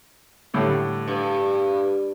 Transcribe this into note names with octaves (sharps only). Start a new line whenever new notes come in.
A2 D3 G3
G2